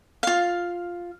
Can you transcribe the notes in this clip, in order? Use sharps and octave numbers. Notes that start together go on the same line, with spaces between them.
F4 F5